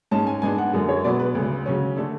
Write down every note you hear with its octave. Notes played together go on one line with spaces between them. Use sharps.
G#2 G#3 C#4 A5
G#5
G#2 G#3 B3 D4 G#5
F#5
F#2 D3 G#3
C#5
B2 F#3 B3 D5
B4
D2 C#3 G#3
C#3 F#3 C#4
D3 A3 D4 A4